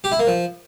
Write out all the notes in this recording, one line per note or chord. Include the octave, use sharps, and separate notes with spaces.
G4
E4
A#3
F3